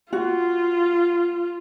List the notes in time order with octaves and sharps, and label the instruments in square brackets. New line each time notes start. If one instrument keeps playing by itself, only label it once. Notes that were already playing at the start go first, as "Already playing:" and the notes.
[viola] F4 [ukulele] F#4